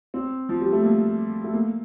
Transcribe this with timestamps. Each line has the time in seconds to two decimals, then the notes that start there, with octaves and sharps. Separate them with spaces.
0.14 C4
0.49 F3
0.61 G3
0.72 A3
0.83 A#3
1.44 A3
1.53 A#3